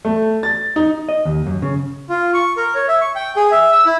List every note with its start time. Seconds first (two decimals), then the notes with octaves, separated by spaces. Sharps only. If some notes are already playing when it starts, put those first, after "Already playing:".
0.05 A3
0.43 A6
0.76 D#4
1.09 D#5
1.25 D#2
1.47 F#2
1.62 C#3
2.09 F4
2.34 C#6
2.57 A#4
2.75 C#5
2.88 E5
3.01 C#6
3.15 G5
3.36 G#4
3.51 E5
3.73 E6
3.86 E4